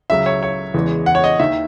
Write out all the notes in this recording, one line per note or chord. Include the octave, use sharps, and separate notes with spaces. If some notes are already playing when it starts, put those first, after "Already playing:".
C#2 C#3 F#3 E5
C#5
C#5
E2 C#3 E3 G#3
F#5
C#5
D#5
D#2 D#3 E5